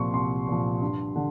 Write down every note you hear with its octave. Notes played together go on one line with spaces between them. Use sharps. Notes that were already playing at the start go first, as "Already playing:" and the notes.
Already playing: C2 A#2 F3 C6 C#6
C2 C6
A#2 F3
G2
D3